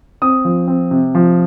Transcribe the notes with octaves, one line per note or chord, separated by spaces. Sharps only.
C4 D#6
F3
C4
C3
F3